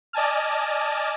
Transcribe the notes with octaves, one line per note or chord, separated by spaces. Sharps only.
D5 D#5 G#5 A5 F6